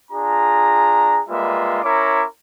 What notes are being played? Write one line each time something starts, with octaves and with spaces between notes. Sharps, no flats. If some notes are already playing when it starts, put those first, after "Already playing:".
D4 F4 G#4 A#5
G3 G#3 A#3 F4 B4 E5
C#4 E4 A#4 C#5 A#5 D6